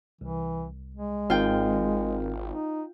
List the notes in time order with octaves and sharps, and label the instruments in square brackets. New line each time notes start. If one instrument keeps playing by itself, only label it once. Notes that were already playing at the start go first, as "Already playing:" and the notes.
[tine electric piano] C2 [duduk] E3
[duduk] G#3
[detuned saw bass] G#1 [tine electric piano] C4 D#4 A#4 [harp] F4 G5
[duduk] D#4